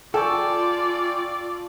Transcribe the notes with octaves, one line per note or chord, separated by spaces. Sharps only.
F4 A4 D5 G5 G#5 C#6